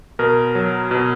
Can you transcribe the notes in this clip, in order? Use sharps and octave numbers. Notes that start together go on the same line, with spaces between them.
B2 A#4
F#3
B2